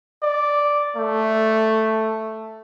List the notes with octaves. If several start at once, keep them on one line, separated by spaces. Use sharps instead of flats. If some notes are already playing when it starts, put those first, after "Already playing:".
D5
A3